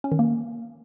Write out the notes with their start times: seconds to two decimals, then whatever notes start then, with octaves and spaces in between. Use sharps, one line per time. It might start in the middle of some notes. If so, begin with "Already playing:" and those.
0.04 C#4
0.12 D#3
0.19 A#3